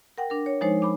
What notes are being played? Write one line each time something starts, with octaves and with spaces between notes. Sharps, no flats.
A#4 F#5 G5
D4 A#4
C#5
F3 G#3 D#4 C5 C#5
B5 D6